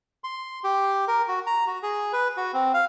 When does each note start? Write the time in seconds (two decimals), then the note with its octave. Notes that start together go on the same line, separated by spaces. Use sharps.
0.24 C6
0.64 G4
1.08 A#4
1.28 F#4
1.47 A#5
1.67 F#4
1.83 G#4
2.13 B4
2.37 F#4
2.54 C4
2.74 F5